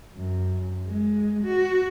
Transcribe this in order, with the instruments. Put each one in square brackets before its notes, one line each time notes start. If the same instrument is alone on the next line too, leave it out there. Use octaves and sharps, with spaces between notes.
[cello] F#2
G#3
F#4